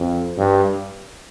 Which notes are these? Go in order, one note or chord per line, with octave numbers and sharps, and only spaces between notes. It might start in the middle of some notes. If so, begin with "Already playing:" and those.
Already playing: F2
G2